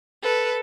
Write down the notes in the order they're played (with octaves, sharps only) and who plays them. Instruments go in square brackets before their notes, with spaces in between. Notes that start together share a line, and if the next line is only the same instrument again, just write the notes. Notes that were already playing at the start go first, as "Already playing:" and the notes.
[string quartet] A4 B4